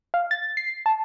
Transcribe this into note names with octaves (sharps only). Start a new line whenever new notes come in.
F5
A6
C7
A5